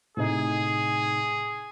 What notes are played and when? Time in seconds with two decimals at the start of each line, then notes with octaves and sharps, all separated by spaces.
0.17 A2 C3 D#4 G#4